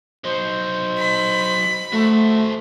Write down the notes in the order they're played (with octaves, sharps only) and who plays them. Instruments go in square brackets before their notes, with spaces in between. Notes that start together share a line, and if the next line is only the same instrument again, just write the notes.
[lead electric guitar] F#3 D#4 [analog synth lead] C5
[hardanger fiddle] B5
[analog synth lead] A3 [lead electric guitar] F#4 C5